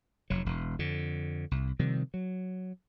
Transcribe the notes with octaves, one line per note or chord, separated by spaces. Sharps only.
F1 F#3
E1
F2 D3
C2
C3 D#3 F3 G3
F#3